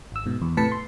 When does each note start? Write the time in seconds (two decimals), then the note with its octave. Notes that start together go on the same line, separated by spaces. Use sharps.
0.12 G#1 E6
0.26 G#2 B2
0.42 E2
0.57 A2 C3 B4 A5 B6 C#7
0.72 C6